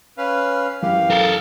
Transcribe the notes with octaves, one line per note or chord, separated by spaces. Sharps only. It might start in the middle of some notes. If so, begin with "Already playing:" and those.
C#4 B4 F5
F#2 E3 G4 F5
A4 A#4